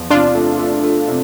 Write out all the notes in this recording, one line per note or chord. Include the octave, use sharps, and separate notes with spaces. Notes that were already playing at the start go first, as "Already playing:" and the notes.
Already playing: E2 F3
C3 D4 F4
A3
A3
A3
C3